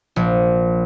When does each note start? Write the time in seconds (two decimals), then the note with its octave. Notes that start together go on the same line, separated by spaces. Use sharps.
0.16 A#1